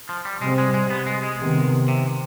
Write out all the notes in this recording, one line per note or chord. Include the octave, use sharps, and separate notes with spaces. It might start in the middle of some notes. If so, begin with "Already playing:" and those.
F3
G3
C3 G3 G#3 C4
G#3
G#3
B3
G#3
G#3
C3 D#3 B3
C3